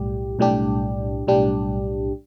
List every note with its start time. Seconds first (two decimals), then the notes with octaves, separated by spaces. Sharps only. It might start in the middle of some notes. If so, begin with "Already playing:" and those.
Already playing: B1 A2 G3 G4
0.39 B1 A2 G3 D4 G4
1.27 B1 A2 G3 D4 G4